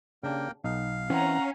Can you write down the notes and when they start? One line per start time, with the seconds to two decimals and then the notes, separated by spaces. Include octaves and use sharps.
0.23 C#3 A#3 D4 G4 A#4 G5
0.64 B1 D#4 F5
1.10 E3 C4 C#4 F#5 A#5